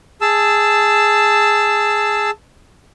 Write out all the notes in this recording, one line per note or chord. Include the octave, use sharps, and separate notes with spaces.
G#4 A5 E6